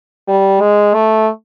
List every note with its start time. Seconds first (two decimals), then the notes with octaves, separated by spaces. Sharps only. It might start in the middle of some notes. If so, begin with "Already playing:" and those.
0.28 G3
0.60 G#3
0.94 A3